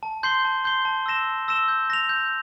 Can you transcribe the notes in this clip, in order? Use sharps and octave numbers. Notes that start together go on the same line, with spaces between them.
A5
C6 G6 C7 G7
A5
C6 G6 C7 G7
A5
E6 A#6 E7 G7
A5
E6 A#6 E7 G7
G6
A#6 F7
G6